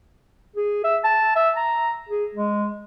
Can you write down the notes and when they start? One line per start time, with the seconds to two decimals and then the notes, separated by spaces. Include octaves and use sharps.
0.56 G#4
0.84 E5
1.04 A5
1.36 E5
1.57 A#5
2.09 G#4
2.35 G#3